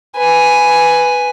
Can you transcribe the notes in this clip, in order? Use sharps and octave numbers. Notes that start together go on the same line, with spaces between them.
B4 G#5